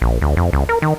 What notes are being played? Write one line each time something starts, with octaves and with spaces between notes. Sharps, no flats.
A#1
D2
F2
C#2
A#4
D#3